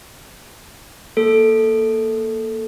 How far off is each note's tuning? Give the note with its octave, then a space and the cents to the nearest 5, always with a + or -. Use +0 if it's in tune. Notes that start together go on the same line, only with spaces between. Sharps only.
A#3 +0 A4 +0